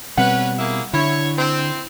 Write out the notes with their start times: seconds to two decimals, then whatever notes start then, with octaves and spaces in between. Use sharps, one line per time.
0.17 B2 G3 C4 C#4 B4 F#5
0.58 A#3 E4 G#4
0.93 D3 E4 C#5
1.38 C4